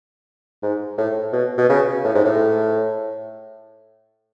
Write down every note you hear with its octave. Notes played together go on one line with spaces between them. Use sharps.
G#2
A2
B2
B2
C#3
A2
G#2
A2